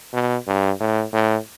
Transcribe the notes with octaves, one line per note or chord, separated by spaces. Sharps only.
B2
G2
A2
A2